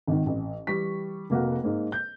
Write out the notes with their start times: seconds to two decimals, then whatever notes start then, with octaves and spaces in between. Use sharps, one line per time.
0.07 G#1 D#3
0.26 A1
0.67 E3 G3 C#6 B6
1.30 F1 A#3 F#4 F#5
1.64 G#2 A#3
1.92 G6